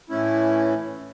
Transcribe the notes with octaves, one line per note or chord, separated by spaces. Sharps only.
A2 E3 A3 C#4 E4